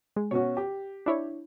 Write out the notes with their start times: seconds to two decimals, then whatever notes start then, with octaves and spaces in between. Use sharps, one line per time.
0.16 G#3
0.31 B2 C#4 F#4 C#5
0.57 G4
1.06 D4 E4 C#5